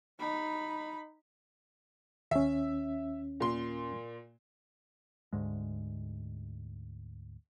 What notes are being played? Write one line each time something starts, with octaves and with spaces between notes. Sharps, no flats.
D#4 B5
D#2 C#4 E5
A#2 C6
D2 G#2 G#3